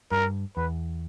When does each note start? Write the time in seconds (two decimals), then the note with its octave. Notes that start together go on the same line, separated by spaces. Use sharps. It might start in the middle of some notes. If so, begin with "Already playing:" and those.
0.11 G2 A#4
0.57 E2 B4